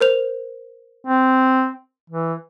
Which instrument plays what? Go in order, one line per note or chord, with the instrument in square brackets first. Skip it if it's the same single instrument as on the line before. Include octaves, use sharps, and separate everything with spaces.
[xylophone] A#4 C5 F7
[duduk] C4
E3